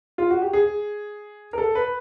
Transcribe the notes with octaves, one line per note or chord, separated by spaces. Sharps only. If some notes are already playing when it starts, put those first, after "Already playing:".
F4
F#4
G4
G#4
A#4
A4
B4